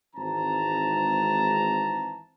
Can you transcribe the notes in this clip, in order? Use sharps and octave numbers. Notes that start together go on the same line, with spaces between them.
G#1 G#2 E3 C4 A5 A#5